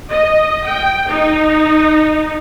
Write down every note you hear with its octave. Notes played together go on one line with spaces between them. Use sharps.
D#5
G5
D#4